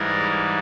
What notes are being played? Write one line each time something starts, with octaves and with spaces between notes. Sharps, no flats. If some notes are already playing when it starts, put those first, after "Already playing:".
Already playing: G#2 E3 G3 G#4 A#4